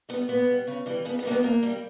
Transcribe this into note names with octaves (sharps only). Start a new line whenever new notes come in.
G3 B3
A#2 B3
G3
C#3
E3 G3
C#3 B3
B3
E3 G3 A#3
B3
A#2 A#3
G3